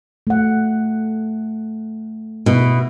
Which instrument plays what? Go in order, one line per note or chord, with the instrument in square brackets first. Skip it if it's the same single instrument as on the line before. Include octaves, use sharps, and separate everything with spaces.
[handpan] A3 F#5
[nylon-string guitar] B2 E4